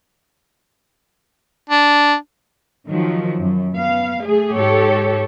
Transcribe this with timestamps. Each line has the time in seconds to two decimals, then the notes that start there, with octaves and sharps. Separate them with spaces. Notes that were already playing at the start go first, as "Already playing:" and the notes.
1.69 D4
2.89 D#3 F3 F#3
3.41 F#2
3.74 B3 F5
4.22 A3 G#4
4.54 G#2 G4 A4 C#5